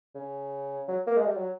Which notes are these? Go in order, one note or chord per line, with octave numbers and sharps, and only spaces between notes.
C#3
F#3
A#3
G#3
G3
F#3